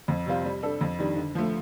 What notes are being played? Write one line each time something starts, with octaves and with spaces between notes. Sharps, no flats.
F2
C3 G3 C4 F4
G3
D4 A4
F2
D#3 G3 D4
D3
F3 A3